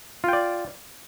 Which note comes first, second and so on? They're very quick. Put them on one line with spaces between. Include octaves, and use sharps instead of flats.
F4 G5 D5